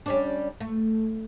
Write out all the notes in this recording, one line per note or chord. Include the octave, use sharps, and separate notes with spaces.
G3 C#4 D4
A3